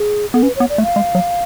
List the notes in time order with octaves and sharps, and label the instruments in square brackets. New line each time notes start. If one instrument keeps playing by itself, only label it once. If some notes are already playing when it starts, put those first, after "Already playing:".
Already playing: [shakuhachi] G#4
[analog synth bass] B3 [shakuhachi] A4
[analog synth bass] C#4 [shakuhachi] B4
[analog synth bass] B3 [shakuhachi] C#5
[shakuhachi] D5
[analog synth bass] A3
[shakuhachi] F5
[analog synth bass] G#3
F#3